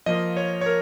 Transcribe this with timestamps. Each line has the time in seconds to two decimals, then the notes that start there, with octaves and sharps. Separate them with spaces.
0.06 F3 A#3 F4 D#5
0.37 C#5
0.61 C#5
0.66 A#4